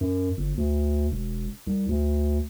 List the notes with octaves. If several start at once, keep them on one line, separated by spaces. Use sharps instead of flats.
F#2
G1
D2
E1
C2
D2